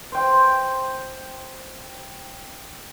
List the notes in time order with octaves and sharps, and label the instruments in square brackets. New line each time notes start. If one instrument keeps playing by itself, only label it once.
[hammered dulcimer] C5 G5